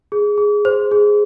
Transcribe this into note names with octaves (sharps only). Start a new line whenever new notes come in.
G#4
G#4
C5
G#4